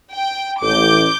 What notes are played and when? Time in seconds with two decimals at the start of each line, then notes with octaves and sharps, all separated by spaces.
0.15 G5
0.62 A1 D6 G6